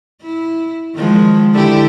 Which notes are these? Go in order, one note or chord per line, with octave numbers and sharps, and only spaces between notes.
E4
D#3 F3 G#3
D3 E4 G4